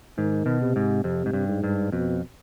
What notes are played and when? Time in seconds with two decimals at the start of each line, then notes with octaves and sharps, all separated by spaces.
0.18 G#2 D#3
0.46 B2
0.62 C3
0.76 G#2
1.04 F2 C3
1.26 G#2
1.33 G2
1.48 G#2
1.64 G2
1.92 F2 B2